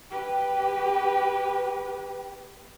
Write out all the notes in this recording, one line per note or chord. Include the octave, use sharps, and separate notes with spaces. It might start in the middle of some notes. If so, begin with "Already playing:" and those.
G4 B4